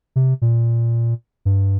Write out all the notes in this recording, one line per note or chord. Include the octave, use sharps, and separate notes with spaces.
C3
A#2
G2